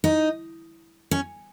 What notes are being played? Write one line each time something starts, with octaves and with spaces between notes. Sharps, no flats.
D#4
C#4